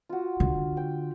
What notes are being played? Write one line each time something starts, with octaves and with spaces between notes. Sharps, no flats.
F4 F#4
D3
G5